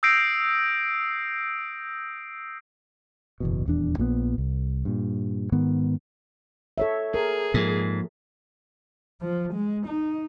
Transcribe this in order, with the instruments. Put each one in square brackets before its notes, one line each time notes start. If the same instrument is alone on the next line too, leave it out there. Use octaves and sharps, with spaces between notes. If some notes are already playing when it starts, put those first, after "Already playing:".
[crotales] D#6 E6 G6 A#6 C7 D7
[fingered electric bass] F#1 E2 B2
D#1 E2 D4
A#1 A#2 D3 B3
C2
G2 A#2
G#2 D#3 B3
[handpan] A4 C#5 E5
[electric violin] G#4 [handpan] A#4
[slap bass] G#2 [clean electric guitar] F3 A#3
[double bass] F3
G#3
D#4